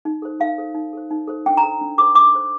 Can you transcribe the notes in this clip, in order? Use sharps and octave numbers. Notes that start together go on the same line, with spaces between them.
D#4
A4 C5
D#4 F5
A4 C5
D#4
A4 C5
D#4
A4 C5
D4 G5
A#5
A4 C5
D4
A4 C5 D6
D4 D6
A4 C5